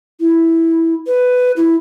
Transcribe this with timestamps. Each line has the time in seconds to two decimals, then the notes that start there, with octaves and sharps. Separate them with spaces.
0.20 E4
1.06 B4
1.56 E4